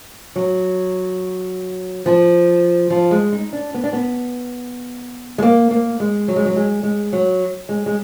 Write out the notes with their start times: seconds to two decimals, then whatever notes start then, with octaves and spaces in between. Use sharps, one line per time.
0.36 F#3
2.06 F3
2.90 F3
3.11 G#3
3.32 D#4
3.53 D4
3.74 B3
3.84 D4
3.93 B3
5.38 G#3
5.42 A#3
5.71 A#3
6.00 G#3
6.28 F#3
6.36 G#3
6.46 F#3
6.56 G#3
6.83 G#3
7.13 F#3
7.69 G#3
7.86 G#3